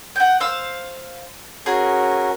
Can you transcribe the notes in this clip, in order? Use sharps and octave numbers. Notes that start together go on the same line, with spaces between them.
F#5 G5
C5 F5 E6
C#4 F#4 G#4 A#4